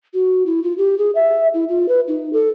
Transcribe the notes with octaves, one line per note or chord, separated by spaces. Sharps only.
F#4
E4
F4
G4
G#4
E5
E4
F4
B4
D#4
A4